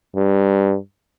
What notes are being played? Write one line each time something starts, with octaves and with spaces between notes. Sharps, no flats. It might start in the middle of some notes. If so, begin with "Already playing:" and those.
G2